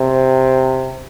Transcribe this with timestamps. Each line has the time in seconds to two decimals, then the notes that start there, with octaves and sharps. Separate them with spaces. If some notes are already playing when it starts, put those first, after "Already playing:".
Already playing: C3